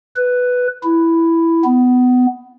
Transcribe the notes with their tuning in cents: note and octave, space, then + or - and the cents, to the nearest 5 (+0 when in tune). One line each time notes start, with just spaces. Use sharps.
B4 +5
E4 +5
B3 +20